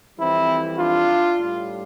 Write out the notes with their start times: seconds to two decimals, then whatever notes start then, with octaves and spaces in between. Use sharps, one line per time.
0.19 F2 E3 G3 C4 E4
0.77 D4 F4
1.37 A2 G3